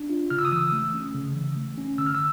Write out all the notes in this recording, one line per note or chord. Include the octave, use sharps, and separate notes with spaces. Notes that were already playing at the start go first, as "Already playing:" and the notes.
Already playing: D4
F4
C#3 F6
E6
D#6
E3 E6
A3
C#4
C#3
E3
A3
C#4
D3 E6
F6
E6